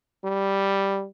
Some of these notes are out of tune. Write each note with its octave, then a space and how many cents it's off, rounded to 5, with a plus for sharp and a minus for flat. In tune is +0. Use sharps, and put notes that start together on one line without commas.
G3 +0